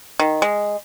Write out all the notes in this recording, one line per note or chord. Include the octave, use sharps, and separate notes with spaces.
D#3
G#3